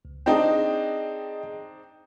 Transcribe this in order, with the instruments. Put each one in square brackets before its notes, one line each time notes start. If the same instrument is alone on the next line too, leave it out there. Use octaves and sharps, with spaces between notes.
[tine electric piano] C#2
[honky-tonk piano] C4 D4 D#4 [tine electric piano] G#4 D#5 G5